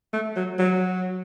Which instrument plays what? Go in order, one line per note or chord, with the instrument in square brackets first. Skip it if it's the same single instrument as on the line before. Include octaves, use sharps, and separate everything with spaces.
[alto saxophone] A3
F#3
F#3